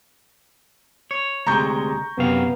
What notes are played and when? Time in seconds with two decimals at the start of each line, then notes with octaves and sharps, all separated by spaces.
1.11 C#5
1.47 D2 C3 G#3 A#5 C#6 G6
2.18 F#2 C3 B3 F5